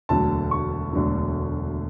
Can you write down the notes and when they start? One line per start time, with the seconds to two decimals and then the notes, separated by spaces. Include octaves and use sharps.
0.09 E1 D2 D3 F#3 A5
0.51 C#6
0.93 E1 D2 D3 F#3